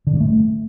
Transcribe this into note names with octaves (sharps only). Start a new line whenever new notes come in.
D3
G2
A3